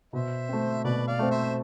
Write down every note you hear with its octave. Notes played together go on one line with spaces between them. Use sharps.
B2 C5 E5
A3 C4
B2 B4 D5
D5 F5
A3 C4
C5 E5